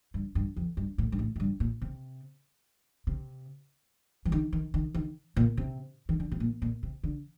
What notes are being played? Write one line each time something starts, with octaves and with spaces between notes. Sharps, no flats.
G2
G2
F2
G2
A2
G2
A2
A2
G2
A#2
C3
C3
F3
D#3
D#3
D#3
D#3
A#2
C3
D#3
D3
C3
A#2
A#2
C3
D3